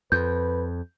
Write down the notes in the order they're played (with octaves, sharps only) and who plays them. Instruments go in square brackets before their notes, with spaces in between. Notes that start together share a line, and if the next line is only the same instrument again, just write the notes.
[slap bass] F2 [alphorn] B4 [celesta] G6